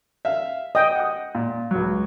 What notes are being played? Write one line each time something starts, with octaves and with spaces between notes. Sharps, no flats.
E5 F5
D#5 G5 D#6
F#5 D#6
A#2
C#2 F#3